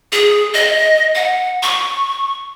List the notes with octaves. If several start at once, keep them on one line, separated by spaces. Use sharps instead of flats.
G#4
D#5
F#5
C#6